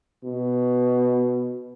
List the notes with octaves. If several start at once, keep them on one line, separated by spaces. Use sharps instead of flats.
B2